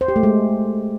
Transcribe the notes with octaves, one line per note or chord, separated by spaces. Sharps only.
C5
G4
A3
G#3